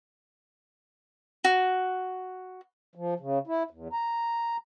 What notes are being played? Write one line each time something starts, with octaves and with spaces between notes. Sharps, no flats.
F#4
F3
C#3
E4
E2
A#5